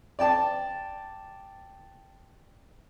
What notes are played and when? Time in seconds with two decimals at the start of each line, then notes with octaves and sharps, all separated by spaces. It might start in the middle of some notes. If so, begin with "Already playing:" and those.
0.19 D5 G5 A5